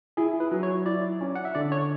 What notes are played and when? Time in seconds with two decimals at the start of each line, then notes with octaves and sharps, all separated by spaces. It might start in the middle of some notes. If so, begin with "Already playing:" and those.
0.17 E4 G#4
0.40 B4
0.51 F#3
0.63 C#5
0.85 E4 D5
1.21 C#4
1.35 F#5
1.45 E5
1.55 D3 D5
1.72 C#5